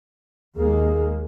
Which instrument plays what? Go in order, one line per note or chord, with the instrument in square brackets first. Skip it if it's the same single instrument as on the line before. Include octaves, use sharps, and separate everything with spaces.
[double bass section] D#2 G#3 A#3 [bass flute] G#4